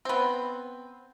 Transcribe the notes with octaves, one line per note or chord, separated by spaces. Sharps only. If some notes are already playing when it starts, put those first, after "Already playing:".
B3 C4